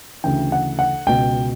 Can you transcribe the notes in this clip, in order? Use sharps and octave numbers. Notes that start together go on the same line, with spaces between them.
D2 C#3 E3 G5
F#5
F#5
C#2 B2 G5